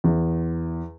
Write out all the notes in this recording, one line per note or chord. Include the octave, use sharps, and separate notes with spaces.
E2